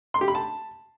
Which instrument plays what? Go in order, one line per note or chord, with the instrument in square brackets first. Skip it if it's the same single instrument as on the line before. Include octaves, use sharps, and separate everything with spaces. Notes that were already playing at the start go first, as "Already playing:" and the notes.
[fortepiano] C6
G4
B5
A5